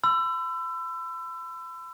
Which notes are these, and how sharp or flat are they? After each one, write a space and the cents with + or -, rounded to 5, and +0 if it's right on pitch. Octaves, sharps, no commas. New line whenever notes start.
B5 +45 E6 +25